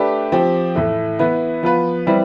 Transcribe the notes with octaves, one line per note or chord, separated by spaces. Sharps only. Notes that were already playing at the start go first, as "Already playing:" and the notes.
Already playing: A3 D4 G4 B4
F3 C4 G4
A2 E3 A3
E3 B3 E4 B4
F3 B3 F4 B4
E3 G3 C4 E4 B4